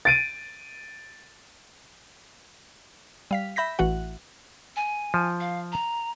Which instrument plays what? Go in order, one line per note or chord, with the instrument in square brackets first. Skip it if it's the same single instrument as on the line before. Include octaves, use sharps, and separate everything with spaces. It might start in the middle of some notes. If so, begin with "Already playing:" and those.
[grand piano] A6 D7 D#7
[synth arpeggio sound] G3 F5 B6
E5 B5 G6 A#6 B6
A1 E3 F#4 F#5
[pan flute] G#5
[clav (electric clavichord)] F3
[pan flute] F5
A#5